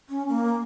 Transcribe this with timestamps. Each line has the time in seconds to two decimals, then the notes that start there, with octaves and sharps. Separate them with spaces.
0.09 C#4
0.29 A#3